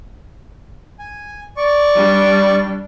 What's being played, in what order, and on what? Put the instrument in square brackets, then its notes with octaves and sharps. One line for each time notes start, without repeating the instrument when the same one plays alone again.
[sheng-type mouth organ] G#5
D5 C#6
[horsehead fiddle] G3 D4